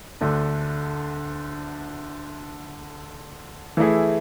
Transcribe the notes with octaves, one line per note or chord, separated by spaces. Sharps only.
D2 D3 A3 D4
E3 A3 E4 G#4